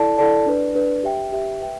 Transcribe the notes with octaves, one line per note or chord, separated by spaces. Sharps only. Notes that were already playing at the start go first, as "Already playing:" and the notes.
Already playing: E4 A4 D5 A5
E4 A4 D5 A5
D4 B4 D5
D4 B4 D5
G4 E5 G5
G4 E5 G5
B4 E5 G5